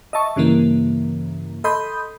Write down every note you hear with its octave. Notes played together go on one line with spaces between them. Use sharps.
D#5 E5 A5 C#6
G2 C#3 E3 A#3
A4 D#5 B5 C6 D#6 G6